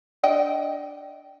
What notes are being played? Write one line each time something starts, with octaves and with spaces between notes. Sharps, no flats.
D4 D#5 G5